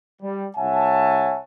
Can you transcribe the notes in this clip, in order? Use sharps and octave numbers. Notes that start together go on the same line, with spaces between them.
G3
C2 C#5 E5 F#5 G#5 A5